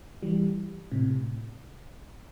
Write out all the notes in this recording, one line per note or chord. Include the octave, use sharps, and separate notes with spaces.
E3 G3
A2 C3